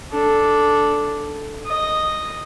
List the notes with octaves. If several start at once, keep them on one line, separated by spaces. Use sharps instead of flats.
D4 A4
D#5